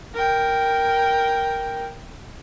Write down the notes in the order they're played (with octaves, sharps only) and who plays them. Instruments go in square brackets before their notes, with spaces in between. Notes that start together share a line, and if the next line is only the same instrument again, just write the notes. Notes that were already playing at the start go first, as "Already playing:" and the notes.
[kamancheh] A#4 G5